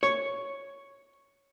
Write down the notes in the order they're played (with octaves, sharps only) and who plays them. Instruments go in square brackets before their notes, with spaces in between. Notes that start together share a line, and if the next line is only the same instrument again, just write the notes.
[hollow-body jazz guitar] C#5